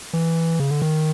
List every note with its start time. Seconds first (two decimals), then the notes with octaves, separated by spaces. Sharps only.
0.13 E3
0.60 C#3
0.70 D3
0.82 D#3